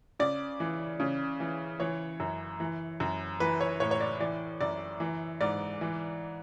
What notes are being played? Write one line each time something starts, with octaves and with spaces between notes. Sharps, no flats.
C#3 D5
E3
C#3
E3
E3 C#5
F#2
E3
F#2
E3 B4
C#5
A2 C#5
C#5
D5
E3 D5
F#2 D5
E3
G#2 D5
E3